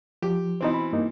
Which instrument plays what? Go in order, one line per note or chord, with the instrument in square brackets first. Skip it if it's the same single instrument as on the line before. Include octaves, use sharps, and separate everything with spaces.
[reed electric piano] F3 [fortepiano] G4
[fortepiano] B2 E3 C4 [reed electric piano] D#4 C5
[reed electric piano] B5
G2 A#3 D#4